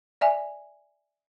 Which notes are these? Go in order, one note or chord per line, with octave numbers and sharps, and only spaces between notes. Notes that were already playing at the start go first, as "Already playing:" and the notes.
D5 E5 G#5